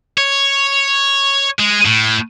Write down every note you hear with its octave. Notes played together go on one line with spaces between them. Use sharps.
C#5
G#3
A2